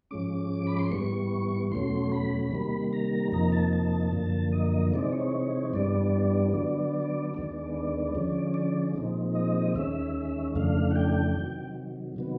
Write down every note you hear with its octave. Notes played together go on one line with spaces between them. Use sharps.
G#2 F3 G#3 C#4 D6
B5
C6
G#2 E3 G3 B3 C#6
E2 B2 F#3 A3 C#4 C6
B5
C3 D#3 G3 A#3
A#5
F2 C3 F3 A#3 D#4 A#5
A5
A5
F#2 D3 F3 A#3
D#5
C3 E3 G#3 C4 D#4 D5
C#5
G2 E3 G3 B3 D4 D5
D3 F#3 B3 D4 D5
D#2 D#3 G#3 B3 D4 D5
D5
D3 F3 G#3 C#4
D5
A#2 F3 G#3 C4 D#4
D#5
D#2 D#3 G#3 C#4 E5
F2 C#3 E3 A3 D4 F5
F#5
G5
C3 D#3 F#3
C3 D#3 F#3 B3